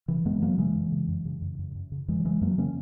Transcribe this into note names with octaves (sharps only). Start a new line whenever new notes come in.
C#3 E3
F#2 G#3 B3
F#2 F#3 A#3
C#3 E3 G#3
F#2
C#3
F#2
C#3
F#2
F#2
F#2
C#3
F#2 E3 G#3
F#3
C#3 E3 G#3
F#2 F#3 A#3
C#3 A#3 C#4